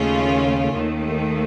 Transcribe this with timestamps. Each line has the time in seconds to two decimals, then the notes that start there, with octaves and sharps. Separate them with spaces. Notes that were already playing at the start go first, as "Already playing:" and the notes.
Already playing: D#2 C#3 A3 C#4 F4
0.75 D#2 D#3 A3